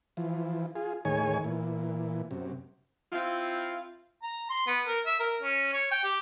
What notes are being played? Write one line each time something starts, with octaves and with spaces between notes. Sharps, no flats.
E3 F3
F4 G#4
D#2 A2 D#3 G#4 C#5 G#5
A#2 E3
F#2 C3
C4 E4 F4
A#5
C6
B3
A#4
E5
A#4
C#4
C#5
G5
G4